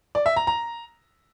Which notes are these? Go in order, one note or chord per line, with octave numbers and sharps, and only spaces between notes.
D5
E5
A#5
A#5